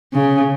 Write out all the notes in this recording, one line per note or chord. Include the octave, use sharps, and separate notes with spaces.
C#3